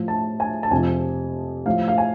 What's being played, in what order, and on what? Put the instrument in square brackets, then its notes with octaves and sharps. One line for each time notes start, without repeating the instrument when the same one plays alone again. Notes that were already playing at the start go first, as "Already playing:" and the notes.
Already playing: [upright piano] A2 F3
A5
G#5
A5
F2 C3 F3 G#5
A2 F3 F5
F5
G#5